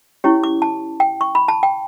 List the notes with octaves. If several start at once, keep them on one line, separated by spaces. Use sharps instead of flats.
C#4 E4 G4 C#5 C#6
D6
A5
G5
C#6
B5
A5
G5